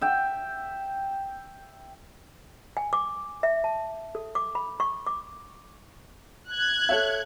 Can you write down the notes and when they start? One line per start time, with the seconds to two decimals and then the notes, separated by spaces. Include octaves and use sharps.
0.01 E5 G5
2.77 G#5
2.93 D6
3.43 E5
3.64 A5
4.15 A4
4.35 D6
4.55 B5
4.80 C#6
5.07 D6
6.51 F#6 G#6
6.89 A4 C#5 E5